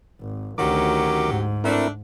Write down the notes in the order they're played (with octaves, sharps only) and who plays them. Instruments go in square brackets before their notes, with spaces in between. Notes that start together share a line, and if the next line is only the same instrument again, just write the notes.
[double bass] G#1
[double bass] D2 [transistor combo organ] D#3 A#4 D6 [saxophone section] F#3 C#4 G4
[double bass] G#2
[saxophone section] A3 D4 [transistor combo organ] C4 E4 A#4